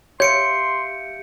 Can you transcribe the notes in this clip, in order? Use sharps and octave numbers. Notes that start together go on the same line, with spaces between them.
G4 C#5 E5 F5 C6 G6 C#7 D7